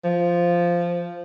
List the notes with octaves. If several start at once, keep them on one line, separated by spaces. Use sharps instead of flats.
F3